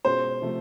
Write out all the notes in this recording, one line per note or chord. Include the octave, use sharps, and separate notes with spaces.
B2 G#3 C#4 F4 C5
C3 F3 A3